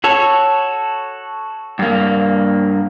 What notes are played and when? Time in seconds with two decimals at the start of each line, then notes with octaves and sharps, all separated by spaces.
0.04 F#4 A4 C#5
1.79 G2 A#3